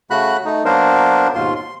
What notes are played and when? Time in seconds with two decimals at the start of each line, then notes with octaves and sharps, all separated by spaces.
0.11 C#3 A3 F#4 B5 F#6
0.45 A3 D#4
0.65 F#3 A#3 B3 D4 A#4 C5
1.35 D#2 G#2 B2 F4 C6
1.56 C6